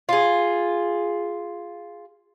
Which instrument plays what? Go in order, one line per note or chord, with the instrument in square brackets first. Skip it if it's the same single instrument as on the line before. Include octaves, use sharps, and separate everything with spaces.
[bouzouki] F4 G#4